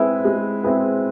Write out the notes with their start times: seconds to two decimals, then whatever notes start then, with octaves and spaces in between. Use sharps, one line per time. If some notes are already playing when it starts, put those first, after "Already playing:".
Already playing: G#3 C4 E4 G#4 B4
0.25 G#3
0.63 C4 E4 G#4 B4